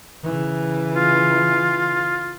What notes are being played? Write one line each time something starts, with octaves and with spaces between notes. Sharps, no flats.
C#3 E3
F4